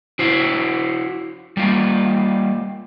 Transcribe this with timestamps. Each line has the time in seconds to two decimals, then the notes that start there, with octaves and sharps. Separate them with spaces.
0.19 E4 F#4 C5
1.57 G3 A#3 F4